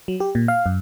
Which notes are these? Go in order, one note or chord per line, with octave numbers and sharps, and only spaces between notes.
F#3
G4
A#2
F5
F#2